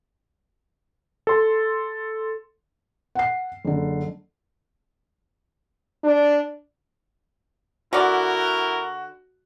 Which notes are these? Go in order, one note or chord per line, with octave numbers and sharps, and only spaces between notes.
A4 C6
F#5 C7
F#1 D3
D4
D3 E4 F#4 A#4 D5